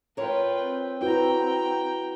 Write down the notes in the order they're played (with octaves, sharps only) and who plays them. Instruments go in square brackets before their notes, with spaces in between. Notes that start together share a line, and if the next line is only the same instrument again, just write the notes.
[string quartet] F4 B4 G5 [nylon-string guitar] A#4 C#5
[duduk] C4
[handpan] E4 F#4 B4 [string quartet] G5 A#5